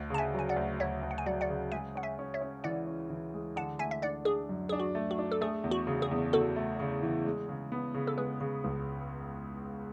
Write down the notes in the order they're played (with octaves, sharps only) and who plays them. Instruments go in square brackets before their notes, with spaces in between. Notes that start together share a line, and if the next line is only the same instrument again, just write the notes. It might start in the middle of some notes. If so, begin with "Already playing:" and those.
Already playing: [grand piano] D2
[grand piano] C#3 [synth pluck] A5
[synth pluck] E5 G#5
[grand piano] F#3 [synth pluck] G#5
[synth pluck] D5 F#5
[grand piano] D2
[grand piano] D2 [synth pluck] C#5 E5
[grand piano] D2
[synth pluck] F#5
G#5
[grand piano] F#3 [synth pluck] D5 F#5
[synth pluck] D5 F#5
[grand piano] C#3
[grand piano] G#3 [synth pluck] E5 G#5
[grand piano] C#4 [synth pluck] F#5
[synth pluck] E5 G#5
[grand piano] C#4
[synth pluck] C#5 E5
[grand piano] C#4
[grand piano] E3 [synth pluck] D5 F#5
[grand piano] C#4
E3
G#3
[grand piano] D3 [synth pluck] F#5 A5
[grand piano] A3 [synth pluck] E5 G#5
[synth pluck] E5
[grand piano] D4 [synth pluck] D5 F#5
[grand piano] D4 [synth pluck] G#4
[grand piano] F#2
[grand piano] D4 [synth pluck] G#4
[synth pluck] F#4
[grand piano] A3
[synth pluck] F#4
[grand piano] D4
[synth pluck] A4
[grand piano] A3 [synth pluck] G#4
[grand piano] E2
[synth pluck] F#4
[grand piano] C#3
[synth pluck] G#4
[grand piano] E2
[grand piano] E2 [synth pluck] F#4 A4
[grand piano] A3
C#3
E3
G#3
C#3
B3
C#3
[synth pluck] A4
[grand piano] G#3 [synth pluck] G#4 B4
[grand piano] C#3
C#2